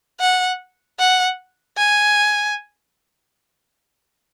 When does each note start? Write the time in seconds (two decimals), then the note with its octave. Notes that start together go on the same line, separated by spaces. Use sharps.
0.21 F#5
0.99 F#5
1.78 G#5